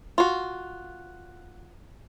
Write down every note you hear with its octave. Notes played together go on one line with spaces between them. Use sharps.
F4 F#4